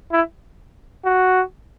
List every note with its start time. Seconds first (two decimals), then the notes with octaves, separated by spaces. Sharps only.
0.12 E4
1.05 F#4